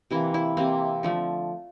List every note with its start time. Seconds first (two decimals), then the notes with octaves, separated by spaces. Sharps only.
0.11 C3 E3 A#3 E4
0.34 E4
0.57 C3 E3 A#3 C4
1.03 D3 F3 A3